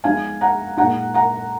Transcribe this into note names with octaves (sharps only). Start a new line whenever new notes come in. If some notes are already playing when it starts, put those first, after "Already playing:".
F3 G#3 B3 D#4 F5 G#5
F#5 A#5
A#2 G#3 D#4 F#5 A#5
F#5 A#5